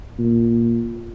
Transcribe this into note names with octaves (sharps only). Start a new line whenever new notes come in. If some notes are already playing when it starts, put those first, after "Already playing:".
A#2